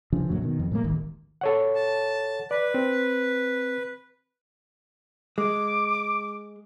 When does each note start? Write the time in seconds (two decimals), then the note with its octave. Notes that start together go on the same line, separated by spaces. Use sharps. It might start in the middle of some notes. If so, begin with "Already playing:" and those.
0.13 C#3 E3 F3 D4
0.29 B1 F#2 A#2 F#3
0.42 B2 D#3
0.59 F2
0.72 A2 G#3 A#3
0.84 D#1 G#1 D#2 D#3
1.41 A4 C#5 F#5
1.75 A5
2.51 B4 D5
2.74 C4
5.38 G#3 D6